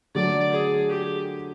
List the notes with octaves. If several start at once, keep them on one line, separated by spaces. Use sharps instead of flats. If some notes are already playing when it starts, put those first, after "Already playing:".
D3 F#3 A3 D5
G#4
G4